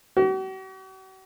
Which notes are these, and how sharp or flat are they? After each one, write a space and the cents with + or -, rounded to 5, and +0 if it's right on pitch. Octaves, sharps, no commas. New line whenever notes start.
F#4 +45